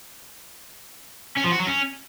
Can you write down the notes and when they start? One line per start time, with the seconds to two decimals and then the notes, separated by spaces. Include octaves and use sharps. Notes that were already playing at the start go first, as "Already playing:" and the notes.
1.37 C#4
1.45 F3
1.52 F#4
1.60 F#3
1.67 C#4